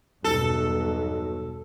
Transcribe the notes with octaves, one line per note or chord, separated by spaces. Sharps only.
B1 E2 G2 B2 A4